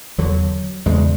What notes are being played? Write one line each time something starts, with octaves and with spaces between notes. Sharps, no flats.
E2 D3 F#3
E2 C#3 G#3